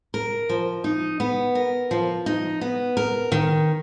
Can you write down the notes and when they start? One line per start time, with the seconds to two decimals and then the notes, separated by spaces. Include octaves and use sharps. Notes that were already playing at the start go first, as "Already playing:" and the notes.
0.14 A#4
0.49 F3
0.84 D#4
1.20 B3
1.55 A#4
1.91 F3
2.26 D#4
2.61 B3
2.97 A#4
3.32 D#3